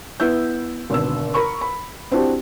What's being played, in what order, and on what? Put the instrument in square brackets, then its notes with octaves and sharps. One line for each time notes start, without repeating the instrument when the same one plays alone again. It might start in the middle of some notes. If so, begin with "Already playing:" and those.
[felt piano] B3 E4 E6 G6
G#1 B2 D3 E6
A#4 B5 C#6
B5
C4 D4 E4 F#4 G4